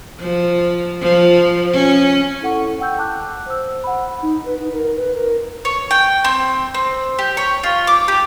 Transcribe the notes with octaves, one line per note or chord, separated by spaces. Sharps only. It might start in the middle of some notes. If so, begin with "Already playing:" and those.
F3
F3
C#4
E4 A4 F#5 C#6
F#5 G5 E6 G6
A5 D6 F#6
C5 E6
F#5 B5
D#4
B4
D#4
A#4
B4
A#4
C#5
G5
C4
C4
G4
C#5
F4
D6
G4